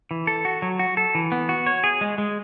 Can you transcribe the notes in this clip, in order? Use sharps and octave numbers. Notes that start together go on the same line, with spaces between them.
E3
A4
F#4
F#3
F#4
A4
E3
B3
F#4
C#5
G#4
G#3
G#3